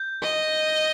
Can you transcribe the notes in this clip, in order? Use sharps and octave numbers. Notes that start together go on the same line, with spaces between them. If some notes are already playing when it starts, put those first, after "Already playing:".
Already playing: G6
D#5